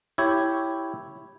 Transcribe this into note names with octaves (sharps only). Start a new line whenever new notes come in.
E4 G4 C#5